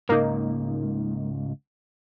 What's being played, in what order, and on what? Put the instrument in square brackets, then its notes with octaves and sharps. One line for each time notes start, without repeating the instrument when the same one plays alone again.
[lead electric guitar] C#2 G#2 [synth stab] A#3 D#4